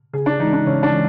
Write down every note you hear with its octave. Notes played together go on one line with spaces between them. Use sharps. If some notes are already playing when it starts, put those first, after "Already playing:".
C#3 G#4
D4
E3 G#3 D#4
D4
C#3 C#4
D4
E3 G#3